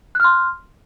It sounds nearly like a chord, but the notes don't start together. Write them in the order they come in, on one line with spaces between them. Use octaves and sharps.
F#6 F6 C6